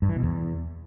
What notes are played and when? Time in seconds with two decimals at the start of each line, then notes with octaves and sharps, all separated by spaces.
0.02 G2
0.09 E3
0.16 B2
0.23 E2